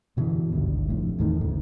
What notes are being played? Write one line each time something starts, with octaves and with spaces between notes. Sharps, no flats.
F#2 B2 D3 E3
G#1 D2 G2
F1 F2 A2
E2 A2 D#3
F#1 D2 A2